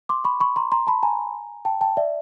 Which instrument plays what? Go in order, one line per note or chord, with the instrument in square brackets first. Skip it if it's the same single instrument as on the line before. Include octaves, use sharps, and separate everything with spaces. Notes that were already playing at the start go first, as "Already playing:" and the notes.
[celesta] C6 D6
B5 C#6
B5 C#6
A#5 C6
A#5 C6
A5 B5
G#5 A#5
G5 A5
G5 A5
D5 E5